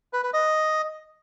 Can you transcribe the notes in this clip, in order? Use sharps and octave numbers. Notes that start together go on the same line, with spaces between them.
B4
B4
D#5